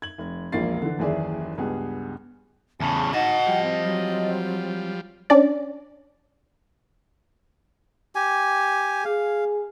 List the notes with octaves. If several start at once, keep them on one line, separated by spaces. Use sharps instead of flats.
G#6 F#7
F1
E1 A#1 A#3 F4 A6 C7
D3 E3
F#1 D#2 E3 G#4 D5 E5
C#2 G2 B3 G#4
E2 C#3 A5
D#4 D#5 F#5 A5
F3 G3 G5
C4
F#3
C#4 D4 D5
G4 G#5
G#4 F5